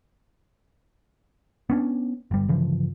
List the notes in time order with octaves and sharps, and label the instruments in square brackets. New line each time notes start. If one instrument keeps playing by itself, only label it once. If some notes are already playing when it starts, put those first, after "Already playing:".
[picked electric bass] B3 C#4 D4
G1 G3
G1 C#3 E3 F3